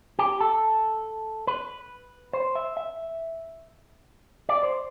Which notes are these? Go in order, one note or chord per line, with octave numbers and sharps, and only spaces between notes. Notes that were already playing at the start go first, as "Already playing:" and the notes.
G4
A4
B4
C5
E5
E5
D5
C5